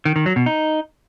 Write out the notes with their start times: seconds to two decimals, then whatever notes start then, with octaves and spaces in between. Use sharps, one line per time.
0.05 D#3
0.16 D#3
0.26 F#3
0.36 B2
0.46 D#4